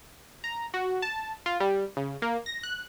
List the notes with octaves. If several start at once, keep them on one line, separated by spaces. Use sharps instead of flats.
A#5
F#4
A5
F4
G3
C#3
A#3
A#6
F#6